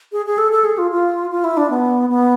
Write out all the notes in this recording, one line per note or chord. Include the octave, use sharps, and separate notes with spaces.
G#4
G#4
A4
A4
G#4
F4
F4
F4
E4
D4
B3
B3